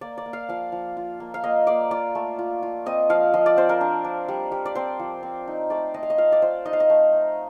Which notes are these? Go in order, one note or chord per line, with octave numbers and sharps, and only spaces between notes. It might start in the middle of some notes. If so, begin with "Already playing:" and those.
A#3 D5
D5
A#3
F5
F3 F5
F3
F4
A#3
F5
A#3 D#5
A#3 D5
F4 D5
A3
F4
F4
C4 D#5
F3 F5
F3 D#5
D5
C4 C5
A#4
D4
D4
G3
G3
D5
C4 C5
F3
C4
D#4
A3 D5
A3 D#5
F5
D#5
F4 F5
D5
F4 C5
D#4 D#5
F5
D#5
A3
D#4